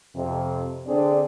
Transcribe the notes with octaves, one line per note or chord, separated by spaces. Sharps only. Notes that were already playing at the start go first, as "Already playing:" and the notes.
F2 C3
D3 C4 D4 G#4 C5 D5